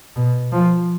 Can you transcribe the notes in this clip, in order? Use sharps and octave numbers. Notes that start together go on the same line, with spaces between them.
B2
F3